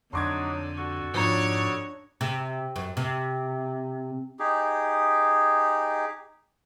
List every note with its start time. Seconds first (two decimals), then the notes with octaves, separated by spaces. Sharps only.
0.13 F2 D3 F#3 D4 D#4 C6 D6 G#6
0.78 F#4 A4 C#6
1.14 F2 G#2 D4 C#5 A#5
2.21 C3
2.76 F#2
2.97 C3
4.39 D#4 G4 G#4